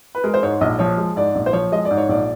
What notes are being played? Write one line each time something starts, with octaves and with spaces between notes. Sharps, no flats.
B4
G#3 A#4
C5
G#2 C#5
A#1 D#5
F3 C#5
G#3
G#2 D5
A#1
C5
F3 C#5
G#3 D#5
D5
G#2
C#5
A#1 D5